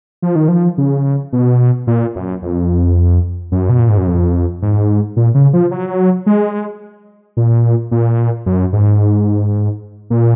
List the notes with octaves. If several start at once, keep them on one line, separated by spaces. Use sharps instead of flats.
F3
D#3
F3
C#3
B2
A#2
F#2
F2
F#2
B2
A#2
G#2
F#2
F2
G#2
A#2
C#3
F3
F#3
G#3
A#2
A#2
F#2
G#2
A#2